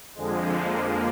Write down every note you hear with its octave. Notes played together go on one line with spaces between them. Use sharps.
F2 D3 F3 G#3
A#3